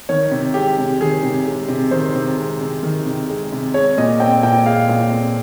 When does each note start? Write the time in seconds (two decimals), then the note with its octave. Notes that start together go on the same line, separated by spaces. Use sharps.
0.09 D#3 C#5
0.31 C3
0.54 G#3 G4
0.78 C3
1.00 D#3 G#4
1.23 C3
1.46 G#3
1.68 C3
1.91 D#3 C5
2.15 C3
2.37 G#3
2.61 C3
2.83 D#3
3.06 C3
3.29 G#3
3.52 C3
3.74 G#3 C#5
3.98 A#2 D#5
4.20 C4 G5
4.43 A#2 G5
4.66 G#3 F5
4.89 A#2
5.12 C4